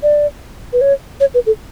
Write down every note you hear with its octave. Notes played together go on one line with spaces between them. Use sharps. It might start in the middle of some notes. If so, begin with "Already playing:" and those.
D5
B4
C#5
C#5
B4
A4